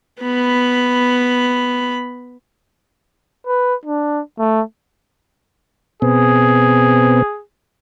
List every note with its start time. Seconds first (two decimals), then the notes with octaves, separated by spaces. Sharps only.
0.23 B3 B5
3.47 B4
3.85 D4
4.39 A3
6.02 B2 B3 C4 G#4